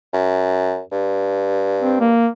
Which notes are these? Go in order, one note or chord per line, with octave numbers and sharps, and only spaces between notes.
F#2
G2
C4
A#3